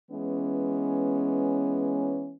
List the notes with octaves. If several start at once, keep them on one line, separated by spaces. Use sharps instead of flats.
E3 G#3 B3 C#4